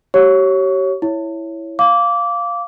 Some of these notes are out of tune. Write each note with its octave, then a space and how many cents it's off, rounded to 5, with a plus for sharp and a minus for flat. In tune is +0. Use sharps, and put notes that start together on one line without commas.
G4 -35 C#5 -10 C#6 +25
E4 +0 C#5 +0
F5 +0 D6 -20